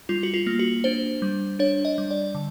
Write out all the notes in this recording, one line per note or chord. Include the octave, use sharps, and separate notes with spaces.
G3 F4
F#4
F4
A#3
F#4
D4 C5
G3
D4 C#5
D#5
G3
D5
D3